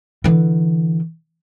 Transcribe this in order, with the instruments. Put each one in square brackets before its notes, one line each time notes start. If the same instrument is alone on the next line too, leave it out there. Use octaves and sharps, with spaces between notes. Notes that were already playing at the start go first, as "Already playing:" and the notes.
[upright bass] D3 E3